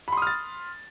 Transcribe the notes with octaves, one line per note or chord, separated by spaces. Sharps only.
B5 C6 D#6 F6 A6